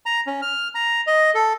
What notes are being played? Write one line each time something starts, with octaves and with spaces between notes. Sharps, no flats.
A#5
C#4
F6
A#5
D#5
A4